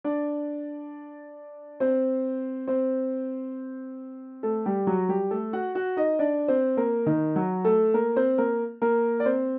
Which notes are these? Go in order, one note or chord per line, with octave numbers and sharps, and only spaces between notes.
D4 D5
C4 C5
C4 C5
A3 A4
G3 G4
F#3 F#4
G3 G4
A3 A4
F#4 F#5
F#4 F#5
D#4 D#5
D4 D5
C4 C5
A#3 A#4
D#3 D#4
F#3 F#4
A3 A4
A#3 A#4
C4 C5
A#3 A#4
A#3 A#4
D5
C4 C5